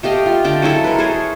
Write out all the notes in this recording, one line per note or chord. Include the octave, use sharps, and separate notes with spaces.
A3 G4 D#5 F5
F4
D3 G5 A5
F#3 G#3 E4 A4
A#4 B4
G#4 A4 C5 C#5